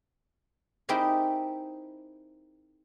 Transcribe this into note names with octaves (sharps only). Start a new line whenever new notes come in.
C4 D#4 E4 G4 G#4 A#4